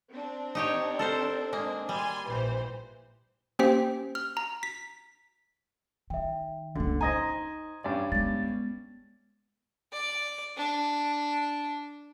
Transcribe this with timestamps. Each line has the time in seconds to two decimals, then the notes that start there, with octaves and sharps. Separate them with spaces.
0.11 C4 D4
0.55 D#4 G4 C#5
0.99 A4 A#4 C5
1.53 G#3 A#3
1.89 G3 G#5 C6
2.26 A#1 E3 C5
3.59 A#3 C#4 G4 C5 G5 B6
4.15 F6
4.37 A#5
4.63 B6
6.10 D#3 E5 G5
6.75 C#2 D3 A#3
7.01 D#4 C5 D#5 G#5 A#5 A#6
7.84 G2 C#4 D5
8.12 G#3 B3 A6
9.92 D5
10.57 D4